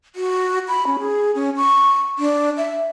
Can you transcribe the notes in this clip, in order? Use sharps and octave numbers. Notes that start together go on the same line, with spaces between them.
F#4
B5
C#4
G#4
C#4
C#6
D4
E5